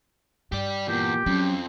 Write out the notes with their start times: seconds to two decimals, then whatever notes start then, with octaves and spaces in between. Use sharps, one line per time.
0.52 G2 G4 D5
0.88 E2 A#2 G4
1.26 F2 F#3 C#4